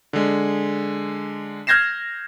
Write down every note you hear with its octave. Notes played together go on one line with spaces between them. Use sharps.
D3 G#3
F6 G6 G#6 A#6 C7 E7